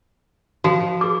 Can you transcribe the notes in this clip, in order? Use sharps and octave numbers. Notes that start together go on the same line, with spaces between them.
F3 F#4
G#4 D6